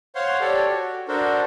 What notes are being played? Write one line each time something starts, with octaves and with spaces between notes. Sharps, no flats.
C5 C#5 F5 F#5 C6
G4 A4 C#5 D5
F#4
D4 F#4 A4 A#4 C5